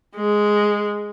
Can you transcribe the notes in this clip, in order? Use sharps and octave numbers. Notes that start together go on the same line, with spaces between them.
G#3